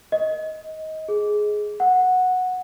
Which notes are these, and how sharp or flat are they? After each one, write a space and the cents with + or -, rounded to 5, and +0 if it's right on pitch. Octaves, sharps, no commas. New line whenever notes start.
D#5 +20
G#4 +10
F#5 -10